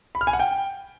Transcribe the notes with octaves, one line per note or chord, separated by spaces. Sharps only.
B5
F6
G#5
F#5
G5